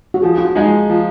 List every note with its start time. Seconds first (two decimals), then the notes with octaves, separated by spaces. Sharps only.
0.14 F#4
0.22 F3 G#4
0.38 F4
0.45 F#4
0.55 G#3 D#4 G#4
0.67 F4
0.90 F3